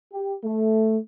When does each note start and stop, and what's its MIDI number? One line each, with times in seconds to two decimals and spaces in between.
0.13 0.33 67
0.43 0.97 57